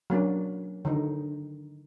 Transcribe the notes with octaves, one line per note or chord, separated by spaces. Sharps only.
F#3 A#3 C#4 D4
D3 D#3 D#4